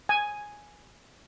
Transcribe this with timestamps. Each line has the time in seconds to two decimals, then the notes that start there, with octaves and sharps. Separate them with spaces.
0.09 G#5